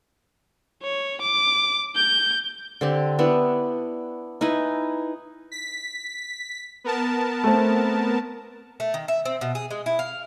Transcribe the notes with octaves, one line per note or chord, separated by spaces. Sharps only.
C#5
D6
G6
D3 C4 G4
B3 D4 E4
D#4 E4 B4 G#5
B6
B3 A#4 A5
A3 C4
A3
D#3
E5
C4
B2
G#4
G#3
E4
F5